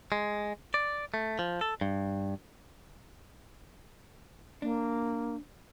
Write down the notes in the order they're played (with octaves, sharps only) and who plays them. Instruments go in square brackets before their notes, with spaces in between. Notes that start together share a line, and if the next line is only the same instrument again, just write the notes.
[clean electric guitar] G#3
D5
A3
F3
A4
G2
[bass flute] A#3 [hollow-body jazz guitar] D4